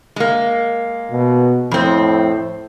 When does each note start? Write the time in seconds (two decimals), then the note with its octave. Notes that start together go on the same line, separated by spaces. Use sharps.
0.16 G#3 A#3
1.11 B2
1.71 F2 A2 C4